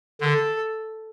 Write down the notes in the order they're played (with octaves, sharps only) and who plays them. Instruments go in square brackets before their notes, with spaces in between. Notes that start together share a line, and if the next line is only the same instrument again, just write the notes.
[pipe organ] D3 [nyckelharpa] A4